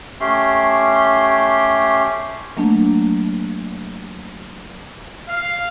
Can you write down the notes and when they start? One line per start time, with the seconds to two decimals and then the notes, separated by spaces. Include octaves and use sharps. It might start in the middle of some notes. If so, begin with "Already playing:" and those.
0.20 A3 C#4 G4 C6
2.57 F#3 A3 A#3 D4
5.28 F5